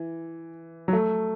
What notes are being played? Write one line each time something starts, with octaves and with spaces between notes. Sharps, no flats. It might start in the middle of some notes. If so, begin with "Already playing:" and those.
Already playing: E3
F#3
A3